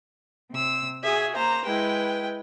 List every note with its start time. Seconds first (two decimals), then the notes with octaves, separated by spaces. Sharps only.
0.52 C3 E6
1.03 F#4 G#4 E5
1.36 A#3 C5 A#5
1.65 G#3 E4 B4 G5